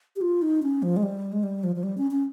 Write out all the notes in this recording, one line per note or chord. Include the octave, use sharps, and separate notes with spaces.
G4
F4
D#4
C#4
F3
G#3
G3
G#3
G3
F3
F3
G3
C#4
C#4